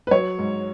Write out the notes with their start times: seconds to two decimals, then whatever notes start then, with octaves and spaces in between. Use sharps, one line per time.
0.07 B4
0.11 F#3 C#5
0.39 G#2